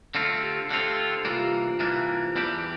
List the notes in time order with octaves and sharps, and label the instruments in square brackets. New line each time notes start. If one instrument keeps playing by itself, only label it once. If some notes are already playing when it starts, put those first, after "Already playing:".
[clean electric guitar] D3 A3 C4 F4
[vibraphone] G4
[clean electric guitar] D3 A3 C4 F4 [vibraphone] A4
[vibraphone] G4
G4
[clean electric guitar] C2 C3 E3 A#3 D4 [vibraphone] F4
[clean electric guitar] C2 C3 E3 A#3 D4 [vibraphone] E4
[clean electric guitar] E2 E3 G3 D4 G4 [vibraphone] E4